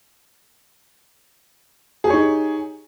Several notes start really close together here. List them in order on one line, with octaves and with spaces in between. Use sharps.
G#4 G4 C#5 D#4